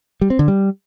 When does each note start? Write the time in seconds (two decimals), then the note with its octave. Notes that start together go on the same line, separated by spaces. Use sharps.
0.21 G3
0.30 C4
0.39 D3
0.48 G3